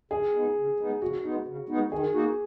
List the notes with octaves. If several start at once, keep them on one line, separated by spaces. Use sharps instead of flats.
C#3 G#4
G#3 B3 D#4
C#3
G#3 B3 D#4
C#3 F#4
G#3 B3 D#4
C#3
G#3 B3 D#4
D#3 G#4
A#3 D#4 F#4